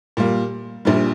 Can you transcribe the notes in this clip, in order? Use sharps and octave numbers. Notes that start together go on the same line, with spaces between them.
A#2 G3 A#3
A#1 A#2 G3